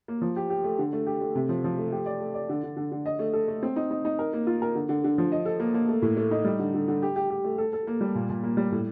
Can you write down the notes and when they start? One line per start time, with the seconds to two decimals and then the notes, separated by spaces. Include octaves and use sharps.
0.08 A#3
0.22 F3
0.36 G4
0.50 G4
0.64 A3
0.79 D3
0.93 A3
1.07 G4
1.21 A3
1.35 C3
1.49 F3
1.64 F3
1.78 A3
1.92 G4
2.06 D5
2.20 A3
2.34 D5
2.49 D3
2.63 D3
2.77 D3
2.92 D3
3.06 D#5
3.19 A3
3.33 A4
3.48 A3
3.63 C4
3.76 D#4
3.91 D#4
4.05 D#4
4.19 A#4
4.33 A#3
4.47 F4
4.62 A#4
4.75 D3
4.89 D3
5.04 D3
5.18 F3
5.32 D#5
5.46 A4
5.60 A#3
5.74 A#3
5.88 A3
6.02 A2
6.17 A3
6.31 D#4
6.45 G3
6.59 D3
6.74 D3
6.88 D3
7.02 G4
7.16 G4
7.30 G4
7.44 A3
7.58 A4
7.73 A4
7.87 A#3
8.01 G3
8.15 A#2
8.29 A#2
8.44 A#3
8.57 G3
8.72 A2